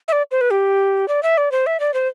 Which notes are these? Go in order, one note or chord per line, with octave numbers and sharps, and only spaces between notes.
E5
D5
C5
B4
G4
D5
E5
D5
C5
E5
D5
C5